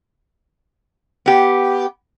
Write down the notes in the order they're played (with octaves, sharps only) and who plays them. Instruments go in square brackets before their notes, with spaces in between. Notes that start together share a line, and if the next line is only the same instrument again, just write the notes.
[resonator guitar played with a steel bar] B3 G4